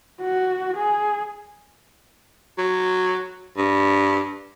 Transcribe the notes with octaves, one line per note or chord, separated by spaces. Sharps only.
F#4
G#4
F#3
G2